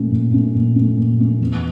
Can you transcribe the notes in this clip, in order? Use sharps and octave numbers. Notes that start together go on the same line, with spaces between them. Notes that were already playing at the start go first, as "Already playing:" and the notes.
Already playing: A#2 A3 C#4
A#2
A3 C#4
A#2
A3 C#4
A#2
A3 C#4
E2